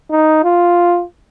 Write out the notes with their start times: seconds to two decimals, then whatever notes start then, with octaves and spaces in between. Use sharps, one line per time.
0.11 D#4
0.44 F4